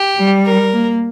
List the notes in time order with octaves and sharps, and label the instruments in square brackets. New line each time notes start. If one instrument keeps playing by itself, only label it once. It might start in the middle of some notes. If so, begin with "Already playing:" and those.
Already playing: [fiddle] G4
[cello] G3
[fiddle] A#4
[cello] A#3